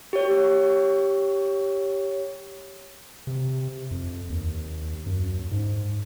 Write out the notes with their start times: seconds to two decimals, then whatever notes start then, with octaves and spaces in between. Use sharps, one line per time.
0.13 G4 C#5
3.27 C3
3.91 F2
4.30 D#2
5.06 F#2
5.51 G#2